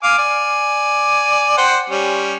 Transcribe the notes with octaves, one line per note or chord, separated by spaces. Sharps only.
F5 G#5 D6
D5 G#5
C5 F#5 G5
G3 C#4